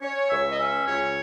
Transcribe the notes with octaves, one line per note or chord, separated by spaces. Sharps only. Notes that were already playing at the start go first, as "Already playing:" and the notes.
C#4 C#5
C#2 E5
D#5
C#4 E5
C#2 C#5